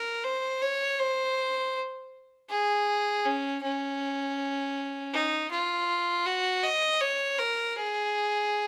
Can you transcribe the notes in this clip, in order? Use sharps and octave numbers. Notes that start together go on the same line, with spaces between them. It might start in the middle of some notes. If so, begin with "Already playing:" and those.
Already playing: A#4
C5
C#5
C5
G#4
C#4
C#4
D#4
F4
F#4
D#5
C#5
A#4
G#4